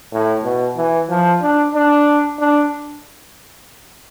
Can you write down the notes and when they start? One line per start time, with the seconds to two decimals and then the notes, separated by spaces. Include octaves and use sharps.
0.12 A2
0.44 B2
0.77 E3
1.10 F3
1.42 D4
1.74 D4
2.40 D4